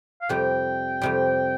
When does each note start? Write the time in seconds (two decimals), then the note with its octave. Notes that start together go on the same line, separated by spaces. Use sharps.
0.22 F5
0.29 F2 C3 G3 G5
1.02 F2 C3 G3